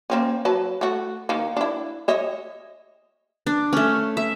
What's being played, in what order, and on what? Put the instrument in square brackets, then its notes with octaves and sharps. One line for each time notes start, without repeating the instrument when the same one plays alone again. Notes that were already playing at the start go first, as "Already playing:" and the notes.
[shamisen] A#3 C4 C#4
F#3 B4 A5
A3 F#4
D#3 A#3
D4 E4
C#5 D#5 E5
[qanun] D4
A3 C#4
E5